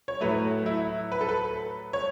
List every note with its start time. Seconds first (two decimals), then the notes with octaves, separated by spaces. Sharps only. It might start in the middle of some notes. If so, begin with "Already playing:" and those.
0.08 C#5
0.21 A2 F#3 A3 B4
0.66 E4
1.12 B4
1.21 A4
1.29 B4
1.93 C#5